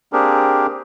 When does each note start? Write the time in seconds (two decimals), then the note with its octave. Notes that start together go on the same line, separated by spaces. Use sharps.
0.13 A#3 C4 D4 G4 G#4 A#4